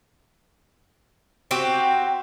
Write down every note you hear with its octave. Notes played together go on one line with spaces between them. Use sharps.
C4 F#4 G4